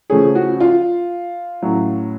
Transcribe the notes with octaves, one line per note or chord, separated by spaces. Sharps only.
C#3 F3 A3 C#4 G#4
F#4
F4
A2 F#3 C#4